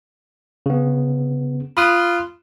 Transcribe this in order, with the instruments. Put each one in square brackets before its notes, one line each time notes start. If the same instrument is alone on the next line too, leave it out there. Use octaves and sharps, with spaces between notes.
[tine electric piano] C#3 B3
[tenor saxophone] F4 [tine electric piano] B5 D#6 F#6